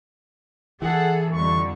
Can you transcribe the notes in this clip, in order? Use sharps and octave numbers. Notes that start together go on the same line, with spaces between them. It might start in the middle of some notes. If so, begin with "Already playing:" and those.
E3 G#4 A4 F#5
F2 D3 G3 C#6